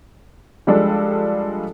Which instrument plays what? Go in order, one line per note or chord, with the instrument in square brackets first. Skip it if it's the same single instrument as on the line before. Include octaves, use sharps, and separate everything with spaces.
[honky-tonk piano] F3 G3 G#3 D4 A4